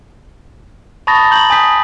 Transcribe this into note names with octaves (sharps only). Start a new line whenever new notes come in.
A5 B5 C#6 D#6 A6 A#6
A#5 C#6 G6 F#7
G#5 D#6 G6 B6